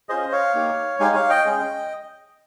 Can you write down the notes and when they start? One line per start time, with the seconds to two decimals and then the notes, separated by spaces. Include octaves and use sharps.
0.09 C#4 F4 G#4 C5 D#5
0.32 C#5 F5
0.54 A#3 D#4 G4
0.99 G#3 D#4 G4 F5 G#5
1.15 C#5 F5
1.30 D#5 G5
1.45 G#3 C#4 G#4